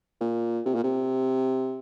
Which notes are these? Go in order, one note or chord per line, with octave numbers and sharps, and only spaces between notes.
A#2
C3
A#2
C3